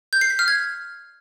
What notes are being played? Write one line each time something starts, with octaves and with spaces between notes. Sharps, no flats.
G6
C7
B6
F6
G#6